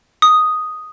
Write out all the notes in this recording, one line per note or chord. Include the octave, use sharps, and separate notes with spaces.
D#6